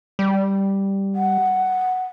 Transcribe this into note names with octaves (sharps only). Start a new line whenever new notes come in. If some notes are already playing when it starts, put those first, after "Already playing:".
G3
F#5